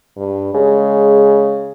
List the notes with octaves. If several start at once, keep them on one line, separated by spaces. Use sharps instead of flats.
G2
C#3 G#3